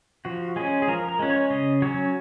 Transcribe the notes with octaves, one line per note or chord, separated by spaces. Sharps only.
F3 F#4
G#3 C#4 G#4
G#4
F3 A#4
A#4
G#3 C#4
C#5
C#3 D#5
F#3 C#4 C#5